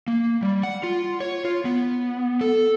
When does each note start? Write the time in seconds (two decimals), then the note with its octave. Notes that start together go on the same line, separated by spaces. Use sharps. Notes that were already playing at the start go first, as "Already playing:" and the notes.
0.08 A#3
0.43 G3
0.63 F#5
0.83 F4
1.20 C#5
1.45 F4
1.65 B3
2.41 A4